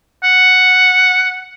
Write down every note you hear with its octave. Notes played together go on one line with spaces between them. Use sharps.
F#5